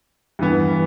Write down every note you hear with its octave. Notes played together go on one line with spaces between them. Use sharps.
G2 E3 B3